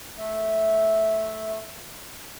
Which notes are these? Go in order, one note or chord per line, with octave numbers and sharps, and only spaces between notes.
A3 E5